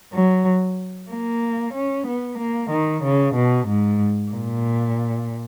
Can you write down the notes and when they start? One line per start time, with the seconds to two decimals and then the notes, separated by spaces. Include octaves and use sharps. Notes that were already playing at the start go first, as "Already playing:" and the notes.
0.14 F#3
1.11 A#3
1.74 C#4
2.07 B3
2.39 A#3
2.71 D#3
3.03 C#3
3.35 B2
3.67 G#2
4.32 A#2